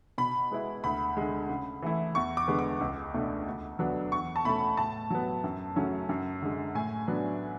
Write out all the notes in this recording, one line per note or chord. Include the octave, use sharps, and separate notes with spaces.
B2 B5
G#3 B3 E4
D2 B5
D3 G#3
C#3
E3 A3 E4
E2 C#6
D6
D3 G#3 B3
D6
C#2
B2 A3 D4
D2
D3 F#3 B3 D4
E2 C#6
A5
B2 A3 C#4 B5
A2 A5
F#3 B3
F#2
C#3 F#3 A3 C#4
F#2
D3 G#3
A2 G#5
F#3 B3 D4